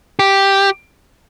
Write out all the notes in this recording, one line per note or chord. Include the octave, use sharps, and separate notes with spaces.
G4